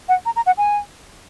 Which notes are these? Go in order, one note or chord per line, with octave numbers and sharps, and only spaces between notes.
F#5
A#5
A#5
F#5
G#5